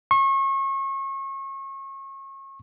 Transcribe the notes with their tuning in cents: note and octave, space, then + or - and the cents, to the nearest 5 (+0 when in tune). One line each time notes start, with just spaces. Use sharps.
C#6 -35